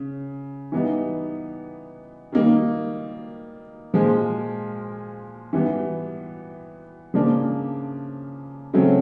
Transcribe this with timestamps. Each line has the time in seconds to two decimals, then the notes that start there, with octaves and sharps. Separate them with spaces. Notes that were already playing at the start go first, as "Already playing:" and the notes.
Already playing: C#3
0.72 E3 G3 B3 D#4
2.32 D#3 G3 A#3 D#4
3.94 A#2 F3 G#3
5.53 E3 G3 B3
7.14 C#3 F3 A#3 D4
8.73 C#3 F#3 A3 C4